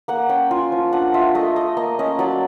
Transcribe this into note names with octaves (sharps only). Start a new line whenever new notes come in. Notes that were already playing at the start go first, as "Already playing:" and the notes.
A#3 F#5
C#4 G5
F4 G#5
F3
D4 F#5
F4 E5
A3 D#5
A3 D#5
A#3 D#5
C#4 D#5
F#3 D5